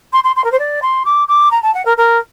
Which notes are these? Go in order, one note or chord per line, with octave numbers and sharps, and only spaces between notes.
C6
C6
C6
A#4
C5
D5
C6
D6
D6
A#5
A5
F#5
A#4
A#4